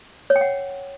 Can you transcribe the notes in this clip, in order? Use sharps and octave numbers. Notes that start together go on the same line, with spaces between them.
C#5
G5
F#5